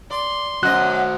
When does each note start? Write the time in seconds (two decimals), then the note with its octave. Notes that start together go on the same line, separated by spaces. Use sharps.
0.10 D5 C6
0.63 F#2 F#4 C5 D#5 F#6